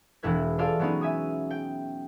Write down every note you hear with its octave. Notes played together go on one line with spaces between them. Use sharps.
E1 G#3 E4 B4 G#6
F4 G#4 A4 D5 F5
F#3 G#3 B3 C#4 D#4
E5 G#5 D#6
G5